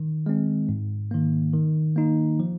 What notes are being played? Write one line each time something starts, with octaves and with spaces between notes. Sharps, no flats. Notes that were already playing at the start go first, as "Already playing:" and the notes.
Already playing: D#3
G#3 C4
G#2
D#3 A#3
D#3
A#3 D#4
F3